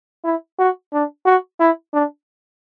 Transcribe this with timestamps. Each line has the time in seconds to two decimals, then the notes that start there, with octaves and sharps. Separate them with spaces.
0.24 E4
0.59 F#4
0.93 D4
1.26 F#4
1.60 E4
1.93 D4